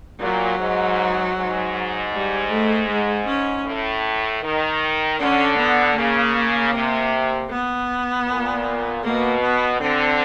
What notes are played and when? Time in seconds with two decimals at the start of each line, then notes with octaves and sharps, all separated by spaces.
0.19 A#2 F#3
0.58 G#2
1.35 G#2
2.12 G3
2.50 A3
2.88 G#3
3.26 C#4
3.65 A2
4.43 D#3
5.19 D3 C#4
5.58 B3
5.96 C#3 A#3
6.73 C3
7.50 B3
8.27 A#2
9.04 B2 A#3
9.43 B3
9.80 D3 C4